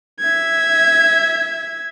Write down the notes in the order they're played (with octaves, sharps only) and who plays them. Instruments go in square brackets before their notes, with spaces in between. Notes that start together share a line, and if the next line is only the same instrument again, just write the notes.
[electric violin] E5 G#6